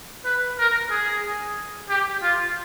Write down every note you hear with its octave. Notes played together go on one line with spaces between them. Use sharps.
B4
A#4
G#4
G4
F4